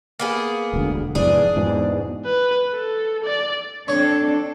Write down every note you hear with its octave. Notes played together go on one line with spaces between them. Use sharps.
A#3 B3 G#4
E1 D2
F1 E2 G#2 D4 G#4
E2 G#2 B2
B4
A4
D5
C4 D4 A4 C#5